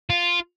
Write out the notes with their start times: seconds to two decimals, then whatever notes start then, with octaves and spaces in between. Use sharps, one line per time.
0.10 F4